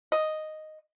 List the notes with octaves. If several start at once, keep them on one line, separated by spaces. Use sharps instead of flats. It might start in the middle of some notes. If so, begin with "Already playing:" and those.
D#5